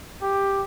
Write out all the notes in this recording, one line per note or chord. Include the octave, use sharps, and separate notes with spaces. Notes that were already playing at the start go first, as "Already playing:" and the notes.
G4